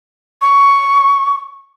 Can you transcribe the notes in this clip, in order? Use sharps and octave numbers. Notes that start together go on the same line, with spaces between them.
C#6